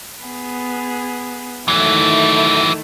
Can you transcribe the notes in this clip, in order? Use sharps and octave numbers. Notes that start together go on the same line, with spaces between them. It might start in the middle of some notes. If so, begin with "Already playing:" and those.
B3 G#4
D#3 E3 F#3 A3 E4